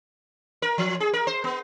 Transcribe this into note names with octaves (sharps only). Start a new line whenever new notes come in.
A#4
F3
G#4
A#4
C5
B3